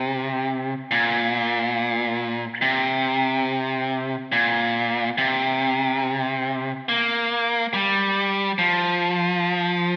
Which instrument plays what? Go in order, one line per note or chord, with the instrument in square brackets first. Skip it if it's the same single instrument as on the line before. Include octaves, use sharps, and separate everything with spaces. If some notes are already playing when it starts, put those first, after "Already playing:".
Already playing: [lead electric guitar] C3
A#2
C3
A#2
C3
A#3
G3
F3